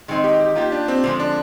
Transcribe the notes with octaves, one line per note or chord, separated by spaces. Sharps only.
D#3 G#3 C4 D#4
G4
G4
A#3 D#4 F4 G4
D4
C4
D3 F3 G#3 C4
D4